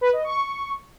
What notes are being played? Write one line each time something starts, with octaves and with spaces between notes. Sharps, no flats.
B4
D#5
C#6